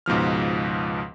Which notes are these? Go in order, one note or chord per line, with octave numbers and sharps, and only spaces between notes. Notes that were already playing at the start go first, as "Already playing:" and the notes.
C#2 G#2 B2 F3 F6